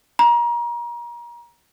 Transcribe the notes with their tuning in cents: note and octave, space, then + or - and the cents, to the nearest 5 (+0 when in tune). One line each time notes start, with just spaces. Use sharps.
A#5 +30